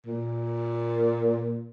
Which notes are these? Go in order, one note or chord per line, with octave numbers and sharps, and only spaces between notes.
A#2